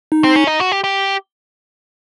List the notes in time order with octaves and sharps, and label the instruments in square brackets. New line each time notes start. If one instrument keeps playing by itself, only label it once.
[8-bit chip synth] D#4
[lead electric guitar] C4
C#4
D#4
F#4
G4
G4